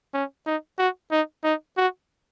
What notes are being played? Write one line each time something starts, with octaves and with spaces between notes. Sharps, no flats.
C#4
D#4
F#4
D#4
D#4
F#4